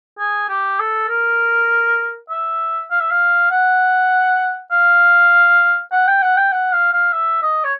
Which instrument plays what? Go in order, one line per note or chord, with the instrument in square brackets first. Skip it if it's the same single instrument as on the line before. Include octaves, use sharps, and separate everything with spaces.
[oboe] G#4
G4
A4
A#4
E5
F5
E5
F5
F#5
F5
F#5
G5
F#5
G5
F#5
F5
F5
E5
D#5
C#5